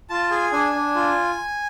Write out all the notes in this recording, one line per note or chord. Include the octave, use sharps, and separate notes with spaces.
F4 A5
G#4 G#5
D4 G#5
D4
F4